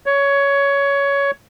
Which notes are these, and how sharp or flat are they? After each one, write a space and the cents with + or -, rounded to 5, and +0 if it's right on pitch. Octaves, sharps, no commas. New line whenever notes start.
C#5 +15